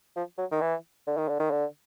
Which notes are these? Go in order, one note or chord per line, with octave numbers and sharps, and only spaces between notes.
F3
F#3
D#3
E3
D3
D#3
D3
D#3
D3